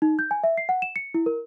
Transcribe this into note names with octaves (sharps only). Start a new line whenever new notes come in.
D#4
G6
G#5
E5
C7
F#5
E7
C#7
E4
A#4